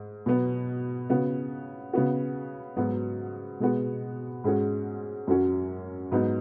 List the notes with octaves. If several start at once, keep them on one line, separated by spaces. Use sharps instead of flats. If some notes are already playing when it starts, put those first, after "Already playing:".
Already playing: G#2
B2 F#3 B3
C#3 B3 F#4
C#3 B3 F#4
G#2 F#3 B3 F#4
B2 G#3 B3 F#4
G#2 G#3 C#4 F#4
F#2 F#3 C#4 F#4
G#2 F#3 B3 D#4